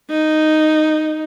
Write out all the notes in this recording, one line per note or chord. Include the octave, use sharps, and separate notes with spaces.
D#4